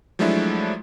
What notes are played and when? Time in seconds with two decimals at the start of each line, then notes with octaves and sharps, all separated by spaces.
0.19 F3 F#3 G#3 A3 D4 E4